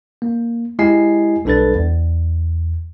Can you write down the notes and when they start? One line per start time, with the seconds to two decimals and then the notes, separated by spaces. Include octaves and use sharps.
0.22 A#3
0.79 G#3 E4 G4 D#5 G#5 C7
1.45 B1 G3 D4 A4 B4 A6
1.75 E2